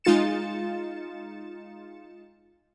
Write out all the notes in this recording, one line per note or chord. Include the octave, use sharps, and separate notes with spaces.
G#3 D#4 F4 A6 C#7 E7